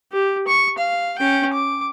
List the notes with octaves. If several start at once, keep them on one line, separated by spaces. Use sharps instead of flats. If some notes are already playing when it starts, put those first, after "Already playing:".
G4
C#6
F5
C#4 G5
D6